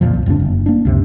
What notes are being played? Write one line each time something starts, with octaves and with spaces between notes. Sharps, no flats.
D1 F2 A#2 F3
C2
D1 F2 C#3 D4
F#1
A#3 D4
C#2 F#2 C3